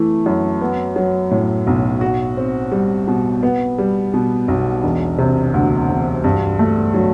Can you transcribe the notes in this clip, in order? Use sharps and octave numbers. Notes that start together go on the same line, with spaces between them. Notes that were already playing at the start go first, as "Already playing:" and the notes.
Already playing: E3 A3 E4
F#2
B3
F#3
A2
B1
F#4
C4
G3
B2
B3
G3
B2
B1
E1
C3
D2
E1
G2
A3
F#3